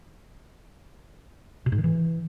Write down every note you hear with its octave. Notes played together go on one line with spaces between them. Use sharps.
B2
G#2
D#3
E3